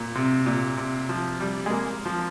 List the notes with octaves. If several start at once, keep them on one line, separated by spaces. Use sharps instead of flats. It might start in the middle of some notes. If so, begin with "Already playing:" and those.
Already playing: A#2
C3
A#2
C3
F3
G3
G#3
A#3
F3